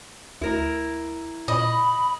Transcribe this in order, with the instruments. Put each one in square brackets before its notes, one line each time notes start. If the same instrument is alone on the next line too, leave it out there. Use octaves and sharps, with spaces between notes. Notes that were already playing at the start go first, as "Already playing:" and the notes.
[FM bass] D2 [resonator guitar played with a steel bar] E4 A#4
[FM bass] A#2 [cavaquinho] D#5 [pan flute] B5